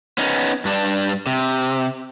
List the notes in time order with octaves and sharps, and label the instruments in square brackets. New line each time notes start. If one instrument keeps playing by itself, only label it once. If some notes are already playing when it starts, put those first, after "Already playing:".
[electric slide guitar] B3 C#4 D#4
G2 D4
C3